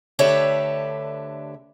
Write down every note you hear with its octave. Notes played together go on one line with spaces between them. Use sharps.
D2 D3 G4 B4 C#5 E5